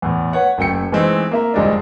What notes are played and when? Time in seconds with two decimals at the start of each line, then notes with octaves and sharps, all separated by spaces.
0.02 E2 A2
0.33 B4 C#5 F#5
0.58 F#1 A3 G5 C#7
0.92 E3 G#3 A3 C4 D#4
1.31 A#3 E5 A#5
1.54 F1 G3 G#3 C4 D4